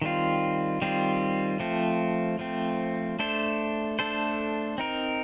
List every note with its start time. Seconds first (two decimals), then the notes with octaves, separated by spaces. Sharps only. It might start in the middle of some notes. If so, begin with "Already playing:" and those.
0.02 D#3 G3 C4 F4
0.81 D#3 G3 C4 F4
1.60 F3 A3 C4
2.39 F3 A3 C4
3.19 A3 D4 A4 C5
3.99 A3 D4 A4 C5
4.78 C4 D#4 A#4